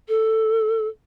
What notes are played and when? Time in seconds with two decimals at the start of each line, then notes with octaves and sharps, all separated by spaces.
0.08 A4